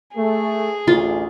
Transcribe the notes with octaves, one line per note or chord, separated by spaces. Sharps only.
A3 G#4
A1 D2 F4